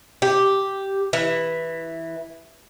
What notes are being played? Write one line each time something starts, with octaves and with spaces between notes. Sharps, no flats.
G4
E3